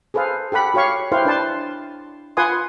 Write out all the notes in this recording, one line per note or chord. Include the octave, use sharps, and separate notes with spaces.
G#4 A4 B4 C5 F5
G4 A4 F#5 B5
F#4 G4 C#5 F5 C#6
E4 G4 B4 C5 F5 C6
D4 B4 A5 C6
F4 B4 F#5 G#5 C6 D#6